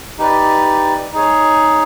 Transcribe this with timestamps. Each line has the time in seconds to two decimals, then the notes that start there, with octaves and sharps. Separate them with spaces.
0.18 D#4 G4 B4 D5
1.12 D#4 G#4 C#5